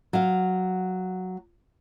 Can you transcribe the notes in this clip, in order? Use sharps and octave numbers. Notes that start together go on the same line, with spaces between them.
F#3 F5